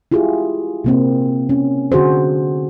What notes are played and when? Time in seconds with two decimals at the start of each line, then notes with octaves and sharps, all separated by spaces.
0.12 E4 F4 G4 G#4
0.84 C3 A#3 C4
1.49 C#4
1.92 D3 F#4 G#4 C5